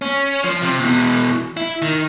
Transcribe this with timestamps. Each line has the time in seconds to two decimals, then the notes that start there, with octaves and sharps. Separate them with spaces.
0.02 C#4
0.44 F3
0.62 C3
0.80 B2 E3
1.57 E4
1.82 D#3